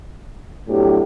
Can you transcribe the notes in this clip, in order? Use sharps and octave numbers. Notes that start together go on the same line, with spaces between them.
A2 F#3 B3 D4 G4